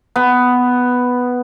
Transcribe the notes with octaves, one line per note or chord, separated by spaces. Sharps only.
B3